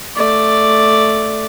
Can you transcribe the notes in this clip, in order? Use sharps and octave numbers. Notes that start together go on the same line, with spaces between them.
A3 D5